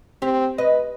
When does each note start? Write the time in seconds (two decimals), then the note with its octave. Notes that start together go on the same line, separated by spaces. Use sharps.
0.22 C4 G4
0.58 B4 D#5